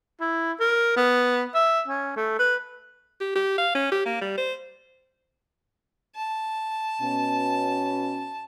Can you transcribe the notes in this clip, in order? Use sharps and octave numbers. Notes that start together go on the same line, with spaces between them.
E4
A#4
B3
E5
C#4
A3
B4
G4
G4
F5
C#4
G4
A#3
G3
C5
A5
B2 C#4